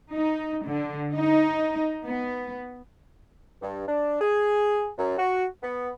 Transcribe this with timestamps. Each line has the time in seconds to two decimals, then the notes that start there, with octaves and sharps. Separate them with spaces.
0.13 D#4
0.65 D3
1.13 D#4
2.04 B3
3.61 G2
3.88 D4
4.21 G#4
4.98 F#2
5.18 F#4
5.63 B3